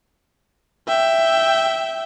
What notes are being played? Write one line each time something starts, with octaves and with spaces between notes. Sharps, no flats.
E5 G5